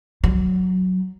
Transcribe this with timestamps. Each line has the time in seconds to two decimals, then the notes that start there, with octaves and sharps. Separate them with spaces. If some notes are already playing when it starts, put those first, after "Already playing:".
0.24 F#3